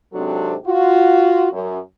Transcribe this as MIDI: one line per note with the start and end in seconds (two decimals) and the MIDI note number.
0.14 0.55 44
0.14 0.55 48
0.14 0.55 54
0.14 0.55 60
0.14 0.55 62
0.14 0.55 69
0.66 1.48 65
0.66 1.48 66
1.51 1.79 42